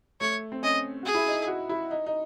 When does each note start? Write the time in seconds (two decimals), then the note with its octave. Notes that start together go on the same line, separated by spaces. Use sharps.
0.21 A3 C#5
0.52 C4
0.63 C#4 D#5
1.03 F#4 G#4
1.15 E4
1.27 D#4
1.48 F#4
1.69 E4
1.91 D#4
2.06 D#4